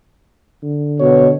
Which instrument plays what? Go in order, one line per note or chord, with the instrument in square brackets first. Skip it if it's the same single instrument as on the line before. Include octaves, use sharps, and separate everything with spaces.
[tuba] D3
[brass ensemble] B2 [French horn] C#5